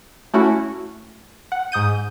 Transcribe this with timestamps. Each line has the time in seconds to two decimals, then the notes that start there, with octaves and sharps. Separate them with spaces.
0.34 A3 C#4 E4 F#4
1.52 F#5
1.72 G#2 D#6 G6 D#7